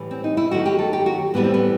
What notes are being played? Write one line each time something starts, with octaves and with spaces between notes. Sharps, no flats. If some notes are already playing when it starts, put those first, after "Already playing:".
Already playing: A2 E3 G3
C4
D#4
E4
D#3 F#3 A3 F#4
G4
A4
G4
F#4
A2 E3 G3 B3
C4
B3